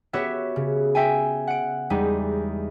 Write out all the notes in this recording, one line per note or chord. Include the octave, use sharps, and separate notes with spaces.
B3 F#4 G4 C#5 E5
C#3
E5 G5 G#5
F#5 D7
E2 G3 G#3 D#4